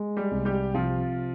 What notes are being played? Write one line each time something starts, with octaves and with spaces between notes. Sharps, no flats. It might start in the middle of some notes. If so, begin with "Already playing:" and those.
Already playing: G#3
G3 G4
C2
G3 G4
C3 F3 F4